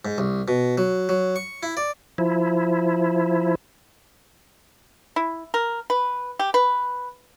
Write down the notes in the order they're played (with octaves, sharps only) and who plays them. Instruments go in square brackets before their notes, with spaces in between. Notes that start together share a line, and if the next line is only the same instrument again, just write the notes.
[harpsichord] G#2
C2
B2
F#3
F#3
C#6
E4
D5
[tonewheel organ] F3 E4
[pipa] E4
A#4
B4
G4
B4